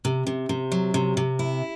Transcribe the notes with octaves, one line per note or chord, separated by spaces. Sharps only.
C3
C3
C3
F#3
C3
C3
E4